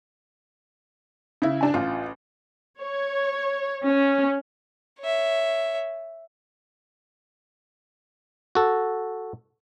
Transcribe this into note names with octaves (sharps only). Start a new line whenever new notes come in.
C#3 E4
D4 G#5
A1 F4
C#5
C#4
C#5 E5
F#4 A4